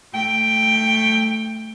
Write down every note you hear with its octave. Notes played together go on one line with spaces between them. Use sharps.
A3 G5